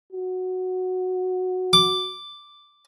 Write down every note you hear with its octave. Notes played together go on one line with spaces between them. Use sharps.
F#4
D6